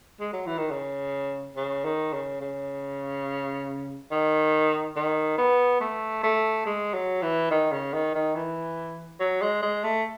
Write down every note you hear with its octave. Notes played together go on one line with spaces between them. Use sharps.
G#3
F#3
E3
D#3
C#3
C#3
D#3
C#3
C#3
D#3
D#3
B3
A3
A3
G#3
F#3
E3
D#3
C#3
D#3
D#3
E3
F#3
G#3
G#3
A3